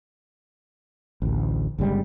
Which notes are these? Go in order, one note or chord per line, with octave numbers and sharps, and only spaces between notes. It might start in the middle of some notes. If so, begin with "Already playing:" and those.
A1 D2
G1 C#3 G3 G#3